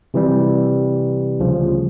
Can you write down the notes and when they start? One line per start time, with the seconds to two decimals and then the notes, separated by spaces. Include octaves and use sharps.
0.14 C3 E3 G3
1.39 D2 C#3 F3